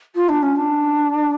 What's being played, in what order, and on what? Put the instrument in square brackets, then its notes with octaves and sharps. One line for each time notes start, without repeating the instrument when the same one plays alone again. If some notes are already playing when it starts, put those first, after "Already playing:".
[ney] F4
D4
C#4
D4